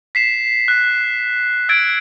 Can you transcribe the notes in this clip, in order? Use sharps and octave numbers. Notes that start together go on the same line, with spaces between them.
B6 C7 E7
F#6
E6 F#6 G#6 A6 D7